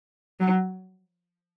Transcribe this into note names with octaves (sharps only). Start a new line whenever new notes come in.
F#3